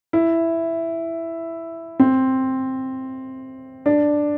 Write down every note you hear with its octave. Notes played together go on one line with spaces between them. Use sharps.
E4
C4
D4